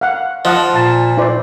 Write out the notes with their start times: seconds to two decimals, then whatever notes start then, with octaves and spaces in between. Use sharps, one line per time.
0.01 F5 F#5
0.45 F3 D#5 F#5 A5
0.75 A#2 A5
1.17 E4 C5 D5